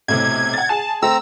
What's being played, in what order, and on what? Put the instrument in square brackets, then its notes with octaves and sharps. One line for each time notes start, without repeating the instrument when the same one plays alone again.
[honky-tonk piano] B1 A2 C3 [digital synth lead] G#6
[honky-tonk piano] F#5 A6
[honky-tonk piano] G#4 G#5 [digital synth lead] A5
[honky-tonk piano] A3 [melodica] C4 A#5 [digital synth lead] E6